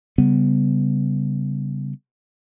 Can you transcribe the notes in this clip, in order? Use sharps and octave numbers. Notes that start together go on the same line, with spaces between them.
C#3 G3 B3